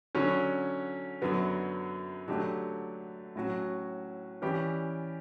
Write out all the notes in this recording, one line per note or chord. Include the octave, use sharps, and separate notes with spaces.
D3 F#3 C#4
F#2 D3 F#3 B3
D3 F#3 A3 D4 G4
A2 F#3 C#4 F#4
E3 G3 C#4 G4